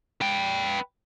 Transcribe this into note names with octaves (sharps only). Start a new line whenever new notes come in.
B4 G5